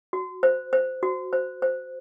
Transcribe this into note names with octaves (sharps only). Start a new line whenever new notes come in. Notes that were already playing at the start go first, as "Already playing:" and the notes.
F#4
C5
C5
F#4
C5
C5